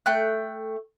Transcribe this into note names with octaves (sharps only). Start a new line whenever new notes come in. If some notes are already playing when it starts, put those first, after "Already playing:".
A3 G5 F#6